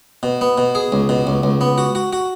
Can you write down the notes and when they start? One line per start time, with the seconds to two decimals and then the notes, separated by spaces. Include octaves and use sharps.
0.23 B2
0.41 B3
0.58 B2
0.75 G#4
0.92 C#2
1.09 B2
1.27 C#2
1.43 C#2
1.61 B3
1.78 F#4
1.95 F#4
2.13 F#4